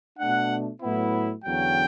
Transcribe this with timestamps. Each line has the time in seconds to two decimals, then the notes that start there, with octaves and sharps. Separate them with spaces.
0.19 B2 A3 D4 F#5
0.82 A2 F#3 B3 E4
1.45 E2 D3 F#3 C#4 G5